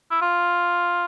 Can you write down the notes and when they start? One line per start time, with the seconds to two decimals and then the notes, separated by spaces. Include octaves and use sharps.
0.11 E4
0.22 F4